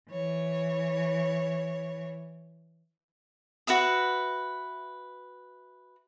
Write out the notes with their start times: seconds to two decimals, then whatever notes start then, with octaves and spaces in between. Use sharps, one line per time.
0.10 E3 C#5
3.67 F#4 B4 E5 D#6